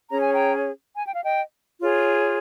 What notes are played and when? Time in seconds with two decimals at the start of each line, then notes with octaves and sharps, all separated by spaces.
0.10 C#4 G#4 C#5 A#5
0.22 G#5
0.33 G5 A#5
0.95 G#5
1.05 G5
1.14 F5
1.24 D#5 G5
1.81 F4 G#4 C#5